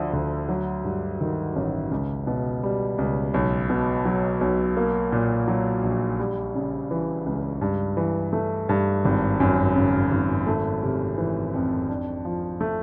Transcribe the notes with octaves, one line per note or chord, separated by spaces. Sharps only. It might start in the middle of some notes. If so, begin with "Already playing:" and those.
Already playing: D2 D3 F3
D2
F#3
G2
D#3
A1
C#2
B2
G3
C#2
B1
B2
F#3
B1
A#3
A#2
F#3
A#1
G3
C#3
E3
C#2
G2
E3
A3
G2
G#1
F#2
C#3
G#1
A3
C3
E3
F2
D4
F3
A3